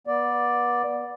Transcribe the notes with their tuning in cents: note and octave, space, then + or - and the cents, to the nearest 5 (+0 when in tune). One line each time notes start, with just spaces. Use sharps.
B3 -30 D5 +0